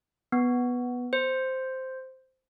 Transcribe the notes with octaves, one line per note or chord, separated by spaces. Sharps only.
B3
C5